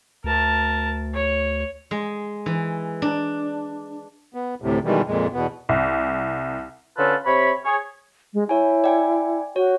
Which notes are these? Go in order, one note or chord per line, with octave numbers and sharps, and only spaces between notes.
D2 A#4 A5
C#5
G#3
E3
D4
B3
D2 A2 C3
B2 D#3 E3 G3 G#3
F2 A#2 G#3
E2 B2 B3
C2
D3 C#4 F4 B4 A5 E6
C3 C4 C#5 B5
G#4 C#5
G#3
E4 C#5 G#5
D5 G5 G#5
F#4 C#5